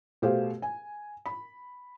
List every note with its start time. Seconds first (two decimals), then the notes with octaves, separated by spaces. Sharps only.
0.22 B2 A3 G4 G#4 C5 F5
0.62 G#5
1.26 B5